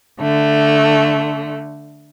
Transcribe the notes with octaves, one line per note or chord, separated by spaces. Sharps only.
D3 A3